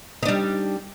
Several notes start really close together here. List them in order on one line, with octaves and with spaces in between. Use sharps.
D#4 D4 G3